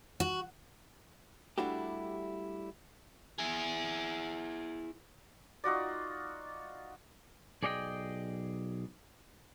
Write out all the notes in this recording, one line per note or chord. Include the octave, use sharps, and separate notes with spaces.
F#4
G3 A3 D4 E4 F#4 G4
E4 G#4
D#4 F4 F#4 D5
B1 G#4 D5 D#5 F5 G5